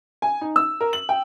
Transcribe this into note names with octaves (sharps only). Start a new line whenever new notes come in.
G#5
D#4
E6
A#4
F#7
G5